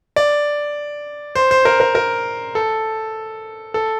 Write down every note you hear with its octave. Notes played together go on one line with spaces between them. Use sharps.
D5
C5
C5
A#4
A#4
A#4
A4
A4